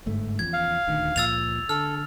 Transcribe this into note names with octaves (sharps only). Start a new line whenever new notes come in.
G1 G#2 A3
E2 C#3 F3 G#6
F5
D#1 D2 D#3
C#2 A#2 F3 E6 A6 F7
D3 A4 F6